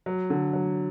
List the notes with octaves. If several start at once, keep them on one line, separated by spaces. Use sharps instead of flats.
F#3
D3
F#3